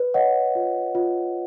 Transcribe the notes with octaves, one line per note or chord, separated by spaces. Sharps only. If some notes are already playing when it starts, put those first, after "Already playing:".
Already playing: B4
C#5 D#5 F#5
F4
F4